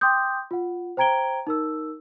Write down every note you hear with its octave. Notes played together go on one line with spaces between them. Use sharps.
G5 C6 D6 D#6 G6
F4 F#5
C5 G5 A#5 G#6 D7 G7
D#4 A#4 E6